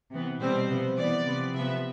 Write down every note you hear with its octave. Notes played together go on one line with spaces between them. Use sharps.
C3 E3 B3
B2 G3 C4 C5
C3 F3 B3
E3 B3 D5
C3 F3 B3
C3 F3 B3 E5